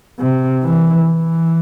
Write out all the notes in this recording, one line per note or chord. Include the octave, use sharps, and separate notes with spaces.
C3
E3
E3